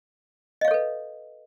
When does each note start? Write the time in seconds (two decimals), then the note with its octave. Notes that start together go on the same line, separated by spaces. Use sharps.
0.61 D#5
0.65 F5
0.68 C#5
0.71 A4
0.74 B4